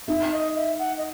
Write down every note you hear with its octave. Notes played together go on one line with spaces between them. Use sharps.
D#4 E5
D#5
E5
F#5
D#5